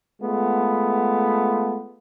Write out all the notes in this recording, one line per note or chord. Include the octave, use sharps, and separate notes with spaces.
G#3 A3 B3 F4